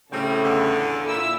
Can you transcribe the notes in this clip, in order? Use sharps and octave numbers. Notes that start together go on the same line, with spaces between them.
A2 C#3 G3 A3 C4 A4
E2 D3
A#2 E4 E6